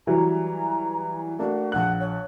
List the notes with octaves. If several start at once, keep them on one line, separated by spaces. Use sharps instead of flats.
E3 F#3 G3 A#5
A3 A#3 D4 F#4
A#1 F#5 F#6
C#5